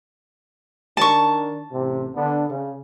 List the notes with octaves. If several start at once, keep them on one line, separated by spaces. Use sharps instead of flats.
D#3 D4 A5 C#6
A1 C3
D3 B3 D4
C#3